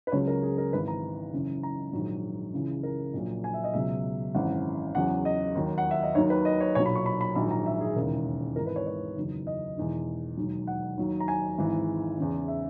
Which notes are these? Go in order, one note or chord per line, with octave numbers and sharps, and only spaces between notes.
B4
C#2 C#3 F#3 C#5
A#4
G#4
A#4
G#1 G#2 E3 B4
A#5
F#1 F#2 E3
A#5
A#1 G#2 D#3 F#3
C#2 C#3 E3
A#4
A#1 A#2 F#3
G#5
E5
D#5
C#2 B2 F#3 E5
G#1 F#2 E3 F#5
E2 C#3 F#3 F#5
D#5
D#2 D#3 F#3
F#5
E5
D#5
D#2 D#3 F#3 C#5
B4
D#5
C#5
B1 A#2 F#3 C#5
B5
C#6
B5
B5
A#1 G#2 D#3 F#3 B5
A#5
E5
G#4
E1 D#2 C#3 E3 A#4
G#1 G#2 E3 A#4
B4
C#5
C#5
F#1 E2 D#3 F#3
D#5
E1 E2 D#3
E1 D#2 D#3 F#3
F#5
D#2 D#3 F#3
A#5
G#5
G#1 G#2 E3
E2 C#3 E3
E5